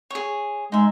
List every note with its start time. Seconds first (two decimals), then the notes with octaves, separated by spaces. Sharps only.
0.10 G#4 C#5
0.72 G#3 D#4 E5